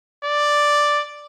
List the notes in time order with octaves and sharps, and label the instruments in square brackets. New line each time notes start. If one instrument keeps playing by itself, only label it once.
[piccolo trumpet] D5